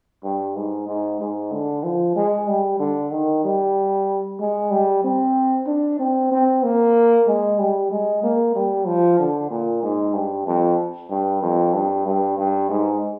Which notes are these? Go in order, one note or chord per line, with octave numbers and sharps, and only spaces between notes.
G2
G#2
G#2
G#2
D3
F3
G#3
G3
D3
D#3
G3
G#3
G3
C4
D4
C4
C4
A#3
G#3
G3
G#3
A#3
G3
F3
D3
A#2
G#2
G2
F2
G2
F2
G2
G2
G2
G#2